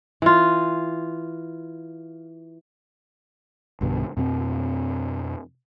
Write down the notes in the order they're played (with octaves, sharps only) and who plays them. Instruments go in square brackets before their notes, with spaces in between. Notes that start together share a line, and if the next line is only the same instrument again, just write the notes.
[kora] E3 F4
[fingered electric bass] B1 G2 B2 D3
F2 B2 B3 C4